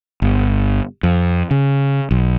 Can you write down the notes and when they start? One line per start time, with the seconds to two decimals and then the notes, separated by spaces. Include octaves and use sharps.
0.22 G1
1.03 F2
1.51 C#3
2.11 B1